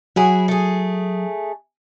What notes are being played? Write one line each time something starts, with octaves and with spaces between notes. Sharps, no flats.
F#3 E4 F#4 G#4
A3 G#4